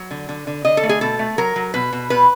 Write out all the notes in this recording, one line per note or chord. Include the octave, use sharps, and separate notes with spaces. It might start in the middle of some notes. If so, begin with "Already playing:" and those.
Already playing: F#3
D3
D3
D3
D3 D#5
A4
A3
G#4
B2 A4
A3
F#3 A#4
F#3
B2 B4
B2
B2 B4